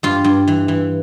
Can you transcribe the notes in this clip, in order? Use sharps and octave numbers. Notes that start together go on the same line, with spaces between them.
G2 F4
G2
E3
E3